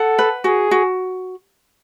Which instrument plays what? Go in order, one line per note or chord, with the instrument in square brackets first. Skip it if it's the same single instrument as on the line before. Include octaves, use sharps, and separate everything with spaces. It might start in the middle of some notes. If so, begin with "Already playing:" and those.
Already playing: [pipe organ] A4 [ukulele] F#5
[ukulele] B4
[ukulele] F#4 [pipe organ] G#4
[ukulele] F#4